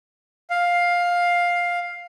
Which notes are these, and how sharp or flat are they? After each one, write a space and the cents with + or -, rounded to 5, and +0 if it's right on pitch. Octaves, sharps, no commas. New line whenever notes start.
F5 +10